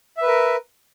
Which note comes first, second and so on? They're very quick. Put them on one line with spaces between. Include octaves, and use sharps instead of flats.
E5 B4 A#4